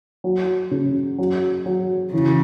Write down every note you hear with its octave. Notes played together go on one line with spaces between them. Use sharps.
F#3
C#3
F#3
F#3
C#3 E3